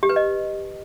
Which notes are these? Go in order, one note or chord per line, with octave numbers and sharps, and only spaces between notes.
G4
B4
D#5